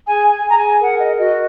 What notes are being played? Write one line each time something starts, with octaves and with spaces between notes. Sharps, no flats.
G#4 G#5
G#5
G#4
A#5
G#5
A#4 F#5
D#5
F#4 D#5